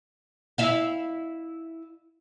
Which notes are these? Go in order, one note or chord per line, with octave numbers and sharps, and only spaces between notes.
E4 E5 F5